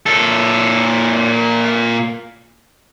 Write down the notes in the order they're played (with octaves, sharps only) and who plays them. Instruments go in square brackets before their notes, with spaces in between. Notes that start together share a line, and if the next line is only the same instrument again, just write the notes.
[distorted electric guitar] A#2 A4